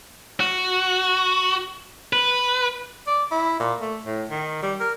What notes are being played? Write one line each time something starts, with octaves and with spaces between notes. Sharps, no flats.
F#4
B4
D5
E4
A#2
A3
A2
D#3
G3
A#4